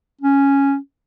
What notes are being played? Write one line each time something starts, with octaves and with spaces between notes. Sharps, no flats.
C#4